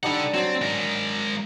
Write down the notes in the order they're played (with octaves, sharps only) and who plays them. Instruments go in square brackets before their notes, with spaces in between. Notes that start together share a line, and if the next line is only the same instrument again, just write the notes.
[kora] G3 D4 D#4 [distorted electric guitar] A4 F#5
[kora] F#3 D5 [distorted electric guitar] C4
[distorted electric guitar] G#3 A#4